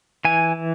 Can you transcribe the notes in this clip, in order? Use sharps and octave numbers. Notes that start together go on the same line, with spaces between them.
E3 G#5